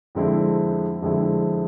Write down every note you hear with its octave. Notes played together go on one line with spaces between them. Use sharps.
F2 D3 G#3 C4 E4
F2 D3 G#3 C4 E4